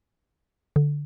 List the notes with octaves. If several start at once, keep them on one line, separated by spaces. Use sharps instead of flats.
D3